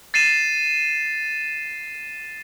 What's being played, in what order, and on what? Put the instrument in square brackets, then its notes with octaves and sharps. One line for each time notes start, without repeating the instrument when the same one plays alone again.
[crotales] A6 C7 D#7 E7